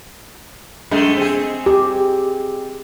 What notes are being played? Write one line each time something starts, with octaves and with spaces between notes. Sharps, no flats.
F#2 G#3 A3
C4 G#4
G4